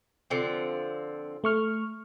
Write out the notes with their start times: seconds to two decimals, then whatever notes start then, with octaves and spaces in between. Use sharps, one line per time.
0.30 D3 F3 C4
1.44 A3 C#6 F6